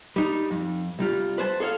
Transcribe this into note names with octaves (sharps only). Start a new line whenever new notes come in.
G3 D#4
F2
C2 G3 F4
B4 C5 G#5 A5
G#4 A4 C#5 F5